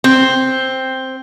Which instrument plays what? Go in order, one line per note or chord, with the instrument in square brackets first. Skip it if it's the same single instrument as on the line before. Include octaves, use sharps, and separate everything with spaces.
[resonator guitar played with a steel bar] C4